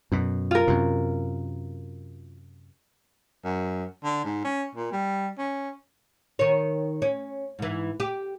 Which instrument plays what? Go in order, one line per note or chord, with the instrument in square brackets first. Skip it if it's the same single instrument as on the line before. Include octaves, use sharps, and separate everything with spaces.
[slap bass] F#2 B2
[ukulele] F4 A#4
[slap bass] F#2 C3
[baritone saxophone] F#2
D3
G#2
C#4
A#2
G3
C#4
[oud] D#3 C#5
C#4
G#2 E3
G4